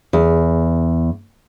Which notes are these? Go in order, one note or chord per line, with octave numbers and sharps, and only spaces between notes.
E2 G#4